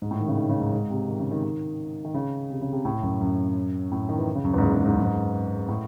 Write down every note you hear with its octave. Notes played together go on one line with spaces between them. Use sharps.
G#2
A2
D#3
C#3
D#3
C#3
G#2
G#2
C3
D#3
C#3
D#3
D#3
D#3
C#3
C3
C#3
C3
A2
F#2
F#2
A2
D#3
E3
C#3
F#2
E2
G#2
F#2
G#2
G#2
F#2
G#2
A2